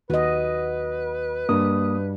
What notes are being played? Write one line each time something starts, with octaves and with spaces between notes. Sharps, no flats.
D#2 F#4 B4 D#5
G2 A#3 D#6